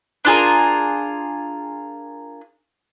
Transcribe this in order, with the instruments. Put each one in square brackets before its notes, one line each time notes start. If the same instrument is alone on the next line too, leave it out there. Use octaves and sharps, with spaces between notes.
[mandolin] D4 F4 G#4 A#4